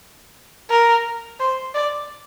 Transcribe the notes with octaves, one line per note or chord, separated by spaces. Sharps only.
A#4
C5
D5